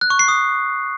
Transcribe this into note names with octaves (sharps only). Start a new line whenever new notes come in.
F#6
C#6
C7
D#6